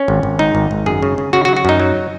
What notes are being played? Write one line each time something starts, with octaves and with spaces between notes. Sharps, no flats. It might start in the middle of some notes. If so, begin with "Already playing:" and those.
Already playing: C#4
G#1
G#1
G#2 D#4
G#1
G#1
F#2 G#4
C#3
C#3
C#3 F#4
F#4
F#3
F#4
F#2 D#4
F#3